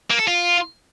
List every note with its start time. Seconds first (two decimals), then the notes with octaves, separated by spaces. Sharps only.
0.10 A#3
0.19 A4
0.27 F4